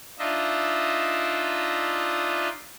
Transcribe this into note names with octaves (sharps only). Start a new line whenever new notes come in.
D4 D#4 F4 D#5 E5